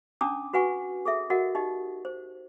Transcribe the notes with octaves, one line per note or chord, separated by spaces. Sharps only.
C#4 D4 A5 A#5 D6 D#6
F#4 B4 F#5 G#5 C#6
G#4 A4 E5
F#4 A#4 D#5 F#5
D#4 G4 D#5
C5